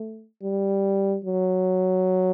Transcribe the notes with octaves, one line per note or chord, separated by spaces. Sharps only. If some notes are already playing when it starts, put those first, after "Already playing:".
Already playing: A3
G3
F#3